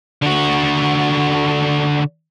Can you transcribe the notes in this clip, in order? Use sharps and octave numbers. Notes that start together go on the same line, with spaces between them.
D3 F#4